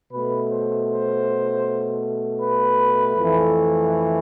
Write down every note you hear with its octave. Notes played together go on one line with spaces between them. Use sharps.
B2 A3 B4
C5
C5
B4
F2 E3 A3